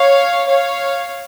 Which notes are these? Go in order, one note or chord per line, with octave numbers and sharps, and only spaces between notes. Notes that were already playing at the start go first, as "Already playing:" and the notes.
Already playing: C#5 F5
C#5 F5